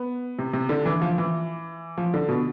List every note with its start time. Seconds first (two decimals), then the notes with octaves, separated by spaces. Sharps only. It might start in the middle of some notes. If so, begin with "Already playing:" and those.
Already playing: B3
0.39 C3
0.53 C3
0.69 D3
0.86 E3
1.02 F3
1.18 E3
1.98 F3
2.14 D3
2.28 B2